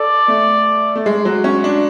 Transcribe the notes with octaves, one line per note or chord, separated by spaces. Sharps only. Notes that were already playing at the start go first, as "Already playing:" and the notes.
Already playing: A4 D5
A3
A3
G#3
F#3
C#4
D4